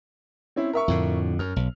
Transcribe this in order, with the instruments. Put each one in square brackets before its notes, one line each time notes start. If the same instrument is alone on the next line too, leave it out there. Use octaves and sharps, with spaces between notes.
[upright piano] C4 C#4 E4
A#4 E5 C#6
[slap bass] F2 A2 D3
[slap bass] F#2 [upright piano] F6
[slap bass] B1